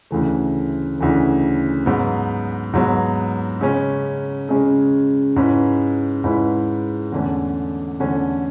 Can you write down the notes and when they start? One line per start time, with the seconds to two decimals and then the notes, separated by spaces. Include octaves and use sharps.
0.11 D2 C#3 E3 A3
0.99 D2 C#3 E3 A3
1.86 G#2 F#3 B3
2.74 G#2 F#3 B3
3.61 C#3 G#3 C#4
4.49 C#3 G#3 C#4
5.36 G#2 G#3 C#4 E4 B4
6.24 G#2 G#3 C#4 E4 B4
7.12 E2 D3 A3 C#4
8.00 E2 D3 A3 C#4